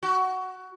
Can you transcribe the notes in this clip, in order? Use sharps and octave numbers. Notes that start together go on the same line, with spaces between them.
F#4